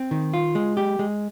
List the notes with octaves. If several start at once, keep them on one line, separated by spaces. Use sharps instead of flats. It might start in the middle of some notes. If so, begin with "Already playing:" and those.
Already playing: C4
D#3
F4
G#3
G4
G#3